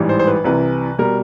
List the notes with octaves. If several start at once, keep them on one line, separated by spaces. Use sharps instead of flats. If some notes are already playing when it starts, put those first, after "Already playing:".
Already playing: A1 G#2 E3 G3
C5
C5
B4
C2 C3 E3 B4
B2 G3 A#4